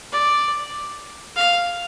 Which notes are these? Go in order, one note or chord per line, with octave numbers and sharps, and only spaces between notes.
D5
F5